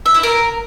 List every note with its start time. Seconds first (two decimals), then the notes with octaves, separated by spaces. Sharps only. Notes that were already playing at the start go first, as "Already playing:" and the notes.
0.06 E5
0.14 E4
0.23 A#4